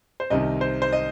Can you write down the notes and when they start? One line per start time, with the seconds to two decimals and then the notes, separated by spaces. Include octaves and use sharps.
0.20 C5
0.30 C2 C3 D#3 D#5
0.61 C5
0.82 C5
0.93 D#5